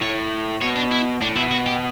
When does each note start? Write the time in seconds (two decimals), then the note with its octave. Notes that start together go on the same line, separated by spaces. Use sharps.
0.01 A2 C#5
0.62 B2 C#5
0.76 D4
0.92 E4
1.22 A2 D4
1.36 B2 E4
1.51 F#4
1.66 G4